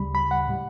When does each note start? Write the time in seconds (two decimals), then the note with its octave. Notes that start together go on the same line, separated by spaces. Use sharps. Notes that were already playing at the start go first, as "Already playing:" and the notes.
Already playing: D2 C#3 G3 B5
0.15 B5
0.31 F#5
0.47 A2 G3